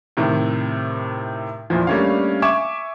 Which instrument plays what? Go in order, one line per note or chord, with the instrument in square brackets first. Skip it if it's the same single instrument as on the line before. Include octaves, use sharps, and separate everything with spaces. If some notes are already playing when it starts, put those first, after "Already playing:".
[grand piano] A2 C3 D#3
E2 A#2 E3 F3
G3 A3 A#3 C#4 D4 F5
E5 G#5 C#6 D6 G#6 E7